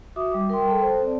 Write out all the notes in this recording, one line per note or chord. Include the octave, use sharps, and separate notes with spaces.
F#4 E5 D6 D#6
G3
A#4 G5 C6
A4 G5 A5
C5
C4 D5